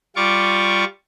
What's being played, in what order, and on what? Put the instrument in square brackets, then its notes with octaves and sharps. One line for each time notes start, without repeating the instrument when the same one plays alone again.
[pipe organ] G3 F4 C#6 D6